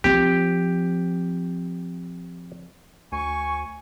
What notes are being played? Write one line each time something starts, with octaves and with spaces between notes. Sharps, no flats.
F3 C4 G4
D2 G#5 C#6